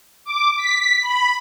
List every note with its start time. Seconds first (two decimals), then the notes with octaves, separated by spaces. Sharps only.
0.24 D6
0.57 B6
1.01 B5